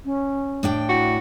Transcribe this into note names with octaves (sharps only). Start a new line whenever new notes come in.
C#4
A2 D4 G5
E4 F#4